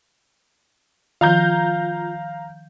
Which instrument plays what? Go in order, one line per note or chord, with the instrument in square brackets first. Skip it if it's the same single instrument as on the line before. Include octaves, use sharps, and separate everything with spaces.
[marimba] D#3 F3 [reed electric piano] F4 [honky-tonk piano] F5 A#5 G6